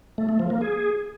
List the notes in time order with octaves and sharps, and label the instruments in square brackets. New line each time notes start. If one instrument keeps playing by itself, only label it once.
[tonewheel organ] A3
A3
F3
A#3
G#4